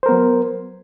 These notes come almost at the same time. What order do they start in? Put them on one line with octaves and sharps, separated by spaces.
C5 A#4 B3 F#3